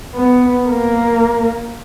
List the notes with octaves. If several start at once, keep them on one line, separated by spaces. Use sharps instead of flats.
B3
A#3